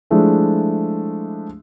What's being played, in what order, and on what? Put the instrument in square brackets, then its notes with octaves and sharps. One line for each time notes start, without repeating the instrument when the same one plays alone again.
[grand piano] F3 G#3 A3 D4 E4